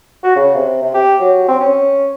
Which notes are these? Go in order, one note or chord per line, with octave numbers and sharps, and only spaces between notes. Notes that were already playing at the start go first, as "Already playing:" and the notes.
F#4
C#3
C3
C3
G4
F#3
C4
C#4